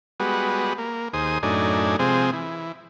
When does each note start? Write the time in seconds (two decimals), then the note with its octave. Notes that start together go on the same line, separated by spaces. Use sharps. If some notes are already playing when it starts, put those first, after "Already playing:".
0.20 G3 G#3 B3 F#4
0.78 A#3
1.13 D#2 G#4 C5 D#6
1.43 F#2 A2 D4 D#4 G#5
1.99 C3 F3 G#3 C4 G#4
2.33 E3